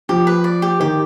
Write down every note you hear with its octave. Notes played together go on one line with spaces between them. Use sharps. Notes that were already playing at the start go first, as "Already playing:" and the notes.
F3 G4
B4
D5
G4
D#3 G4